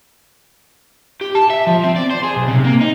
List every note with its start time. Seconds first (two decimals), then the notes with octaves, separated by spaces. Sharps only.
1.21 G4
1.35 A5
1.50 E5
1.67 F3
1.84 C4
1.96 D5
2.10 C5
2.24 G#4
2.36 B1
2.48 C3
2.64 A#3
2.81 D#4